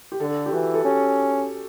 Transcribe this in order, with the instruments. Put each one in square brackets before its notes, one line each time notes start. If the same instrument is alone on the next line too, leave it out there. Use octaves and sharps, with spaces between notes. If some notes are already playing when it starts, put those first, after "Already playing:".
[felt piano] G4
[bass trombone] D3 [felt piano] A4
[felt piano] G4
[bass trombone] E3 [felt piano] F#4
[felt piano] A4
[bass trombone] C#4 [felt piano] G4